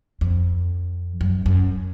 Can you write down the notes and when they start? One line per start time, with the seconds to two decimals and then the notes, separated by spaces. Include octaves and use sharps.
0.21 F2
1.21 F#2
1.46 F#2